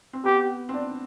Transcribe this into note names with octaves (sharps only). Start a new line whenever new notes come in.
C4
B3 G4
C4
D4